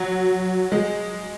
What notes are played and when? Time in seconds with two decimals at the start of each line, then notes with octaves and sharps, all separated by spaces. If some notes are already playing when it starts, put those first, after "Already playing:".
Already playing: F#3
0.72 G#3